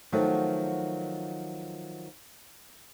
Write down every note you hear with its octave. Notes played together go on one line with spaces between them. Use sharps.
D#3 F3 F#3 A3 B3